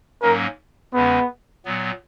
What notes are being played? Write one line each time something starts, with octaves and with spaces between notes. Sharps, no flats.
G#2 F#3 A#3 C#4 A#4
E2 C#3 G#3 B3 C#4
A#2 F#3 B3